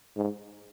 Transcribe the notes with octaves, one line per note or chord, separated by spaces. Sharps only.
G#2